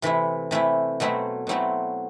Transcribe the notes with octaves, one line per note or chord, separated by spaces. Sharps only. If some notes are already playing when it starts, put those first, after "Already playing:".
C3 E3 A3 E4
C3 E3 A3 E4
B2 F#3 A3 C4 E4
B2 F#3 A3 C4 E4